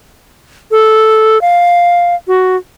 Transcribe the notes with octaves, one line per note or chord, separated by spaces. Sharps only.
A4
F5
F#4